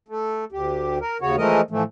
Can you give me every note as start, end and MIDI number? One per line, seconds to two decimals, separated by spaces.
0.08 0.45 57
0.52 0.99 38
0.52 0.99 67
1.01 1.17 70
1.21 1.36 39
1.21 1.36 49
1.21 1.36 66
1.21 1.36 73
1.37 1.61 52
1.37 1.61 53
1.37 1.61 56
1.37 1.61 57
1.37 1.61 70
1.37 1.61 75
1.71 1.83 45
1.71 1.83 52
1.71 1.83 53
1.71 1.83 57